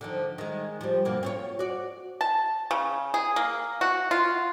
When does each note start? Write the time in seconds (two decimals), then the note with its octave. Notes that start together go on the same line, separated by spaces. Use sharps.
0.01 D3 D#3 F3
0.38 D#3 G#3
0.81 F3 G3
1.05 G2 B2 A#3
1.23 C4 F4 C#5
1.59 F#4 D5
2.21 A5
2.71 C#3
3.14 G#4
3.36 A#3
3.81 F#4
4.11 F4